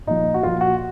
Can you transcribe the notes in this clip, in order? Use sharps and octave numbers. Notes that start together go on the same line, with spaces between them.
A#2 F3 D#4
F#4
A#2 F3 F4
F#4